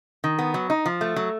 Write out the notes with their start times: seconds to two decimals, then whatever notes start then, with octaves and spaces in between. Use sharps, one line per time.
0.24 D#3
0.39 B3
0.54 F#3
0.70 D#4
0.86 F3
1.01 A3
1.16 F#3